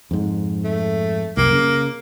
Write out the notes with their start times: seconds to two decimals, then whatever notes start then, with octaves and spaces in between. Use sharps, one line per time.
0.11 F2 G#2
0.64 A3
1.37 C2 F#2 A#3
1.52 C#3